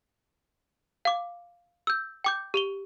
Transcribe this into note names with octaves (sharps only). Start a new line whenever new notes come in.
F5 D6
E6 G6
G5 D6 G6
G4 F7 G7